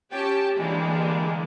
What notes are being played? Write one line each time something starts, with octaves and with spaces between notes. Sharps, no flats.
C#4 G4 G5 A5
D3 E3 G3 G#3 A#3 D4